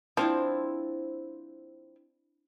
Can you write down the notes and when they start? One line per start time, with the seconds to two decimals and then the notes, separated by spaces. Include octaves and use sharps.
0.17 F3 C4 D4 E4